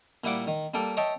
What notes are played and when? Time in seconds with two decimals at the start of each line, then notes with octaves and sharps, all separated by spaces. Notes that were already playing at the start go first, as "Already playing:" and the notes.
0.24 A#2 G3 E4 F#5 D6
0.47 D#3
0.74 G3 A#3 A4 G5
0.97 C#5 D#5 E5 G5 A5